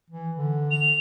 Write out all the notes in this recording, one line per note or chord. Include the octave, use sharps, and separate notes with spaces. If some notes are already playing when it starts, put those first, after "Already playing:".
E3
D3
F7